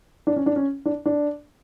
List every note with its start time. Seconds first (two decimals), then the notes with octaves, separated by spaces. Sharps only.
0.27 D4
0.36 C#4
0.46 D4
0.56 C#4
0.86 D4
1.06 D4